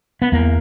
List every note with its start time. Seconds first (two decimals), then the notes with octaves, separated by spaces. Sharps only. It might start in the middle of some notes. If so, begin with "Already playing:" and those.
0.22 B3
0.32 E2 A#3